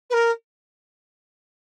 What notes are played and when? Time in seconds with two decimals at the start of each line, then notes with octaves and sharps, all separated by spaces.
0.10 B4
0.14 A#4